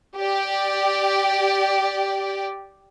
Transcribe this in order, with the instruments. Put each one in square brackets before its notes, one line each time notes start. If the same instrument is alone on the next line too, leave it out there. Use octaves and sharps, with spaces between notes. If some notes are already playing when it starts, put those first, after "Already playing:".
[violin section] G4 D5